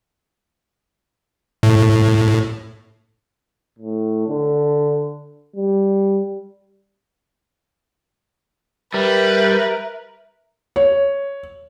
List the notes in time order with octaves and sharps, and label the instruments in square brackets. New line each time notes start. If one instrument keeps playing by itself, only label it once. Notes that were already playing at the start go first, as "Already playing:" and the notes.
[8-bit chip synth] A2
[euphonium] A2
D3
G3
[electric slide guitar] G3 [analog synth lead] A#4 [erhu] B4 [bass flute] E5
[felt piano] C#5